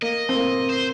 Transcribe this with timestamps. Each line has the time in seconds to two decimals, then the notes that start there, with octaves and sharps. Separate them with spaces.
0.02 A#3 D#5
0.29 C4
0.35 A#3
0.69 C5